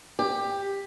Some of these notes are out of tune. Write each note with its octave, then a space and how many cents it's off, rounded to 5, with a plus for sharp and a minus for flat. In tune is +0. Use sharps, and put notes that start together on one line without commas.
G4 +15